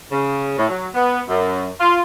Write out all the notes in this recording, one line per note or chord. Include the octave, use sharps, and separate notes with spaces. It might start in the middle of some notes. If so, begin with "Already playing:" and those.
C#3
A2
F#3
B3
F#2
F4